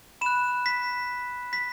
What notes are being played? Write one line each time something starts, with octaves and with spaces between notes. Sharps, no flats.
B5 F#6 E7
B6
B6